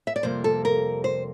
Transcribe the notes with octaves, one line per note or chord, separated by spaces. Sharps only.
E5
D5
F2 C3 G3 A#3 C5
A4
A#4
C5